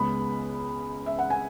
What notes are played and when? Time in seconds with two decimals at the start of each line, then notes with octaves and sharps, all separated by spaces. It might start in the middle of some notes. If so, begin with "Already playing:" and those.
Already playing: C#2 C#3 G#3 B3 B5
1.06 E5
1.19 F#5
1.30 G#5